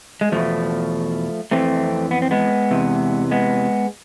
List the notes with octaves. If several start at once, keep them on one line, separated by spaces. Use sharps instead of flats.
G#3
E2 B2 F3 A3
F2 E3 A3 C4
B3
C4
G#3 B3
E2 C3 E3
G#3 B3